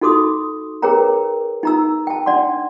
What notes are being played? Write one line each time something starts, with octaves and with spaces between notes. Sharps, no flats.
D#4 F#4 A4 C6 D6 D#6
G#4 A#4 B4 C#5 G5 A#5
D#4 A#5 E6
G5 A5
D4 D5 F#5 C6